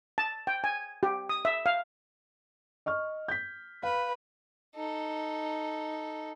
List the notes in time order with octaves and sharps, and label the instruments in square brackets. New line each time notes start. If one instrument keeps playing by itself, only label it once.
[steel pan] A5
G5
G#5
G4
D#6
E5
F5
[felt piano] D#5 C#6 F6
G6 B6
[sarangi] B4 [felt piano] F5
[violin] D#4 A4